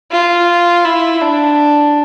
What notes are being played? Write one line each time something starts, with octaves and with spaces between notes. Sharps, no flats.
F4
E4
D4